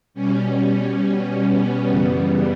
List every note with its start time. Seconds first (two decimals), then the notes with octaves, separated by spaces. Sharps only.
0.14 B2 G3 C#4
1.44 B3
1.88 F#2 C#3 E3 G3 B3